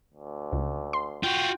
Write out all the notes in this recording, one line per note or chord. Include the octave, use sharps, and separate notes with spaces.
D2
C#2
C6
F4 F#4 G5